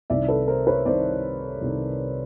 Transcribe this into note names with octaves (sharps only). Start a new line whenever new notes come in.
C2 C3 D#3 D5 E5
A4 B4
A#4 C5
B4 C#5
C2 C3 D#3 C5 D5
C2 C3 D#3